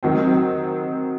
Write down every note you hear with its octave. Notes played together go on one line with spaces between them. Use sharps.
D#3 F#3 C4